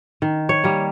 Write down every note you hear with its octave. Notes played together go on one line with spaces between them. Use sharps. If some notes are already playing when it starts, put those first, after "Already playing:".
D#3
C#5
G3 A#3